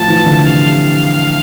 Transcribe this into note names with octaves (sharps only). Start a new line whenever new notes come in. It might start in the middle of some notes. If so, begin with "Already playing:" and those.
Already playing: A2 F3 A5
E3
D3
C3 F5